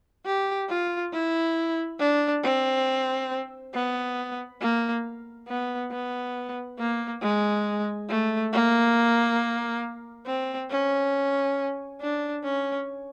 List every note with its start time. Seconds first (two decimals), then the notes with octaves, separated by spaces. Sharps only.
0.25 G4
0.69 F4
1.12 E4
1.99 D4
2.43 C4
3.74 B3
4.61 A#3
5.48 B3
5.91 B3
6.79 A#3
7.22 G#3
8.09 A3
8.53 A#3
10.26 C4
10.70 C#4
12.01 D4
12.44 C#4